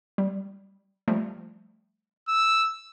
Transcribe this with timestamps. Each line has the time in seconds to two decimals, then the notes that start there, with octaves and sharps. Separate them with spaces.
0.18 G3
1.08 F3 G3 A3
2.29 E6